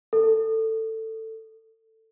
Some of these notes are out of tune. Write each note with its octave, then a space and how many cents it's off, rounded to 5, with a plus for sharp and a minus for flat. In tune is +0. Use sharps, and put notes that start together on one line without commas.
A4 +15